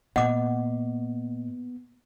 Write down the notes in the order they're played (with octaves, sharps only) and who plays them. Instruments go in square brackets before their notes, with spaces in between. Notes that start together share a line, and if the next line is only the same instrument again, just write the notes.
[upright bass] A#2 [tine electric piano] B3 [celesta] D#5 [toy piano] F#5 D6